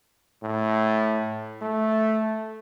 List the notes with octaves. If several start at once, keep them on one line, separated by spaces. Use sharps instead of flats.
A2
A3